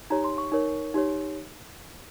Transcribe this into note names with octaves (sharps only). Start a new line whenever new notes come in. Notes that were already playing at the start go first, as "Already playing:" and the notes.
D#4 G4 C#5 A#5
C6
C#6
D#4 A#4 C#5
D#4 G4 C#5